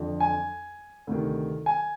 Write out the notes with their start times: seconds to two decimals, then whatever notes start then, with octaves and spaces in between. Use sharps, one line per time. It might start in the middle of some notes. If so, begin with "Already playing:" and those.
Already playing: F2 D3
0.20 G#5
1.07 D2 C3 D#3
1.66 G#5